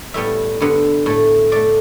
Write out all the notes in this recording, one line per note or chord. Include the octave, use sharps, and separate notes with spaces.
A2 G3 B3 E5
G2 D3 B3
A2 A3
A2 A3 D5